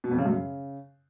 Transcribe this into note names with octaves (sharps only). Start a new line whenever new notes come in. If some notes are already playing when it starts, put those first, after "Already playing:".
B2
F2
C#3
F#2
C#3